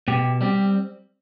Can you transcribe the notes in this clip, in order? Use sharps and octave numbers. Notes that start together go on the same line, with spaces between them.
B2 G4
G3 C4 G4